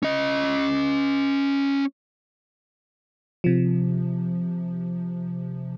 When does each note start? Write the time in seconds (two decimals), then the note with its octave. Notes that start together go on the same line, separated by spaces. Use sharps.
0.03 C#4 D#5
3.44 C3 F3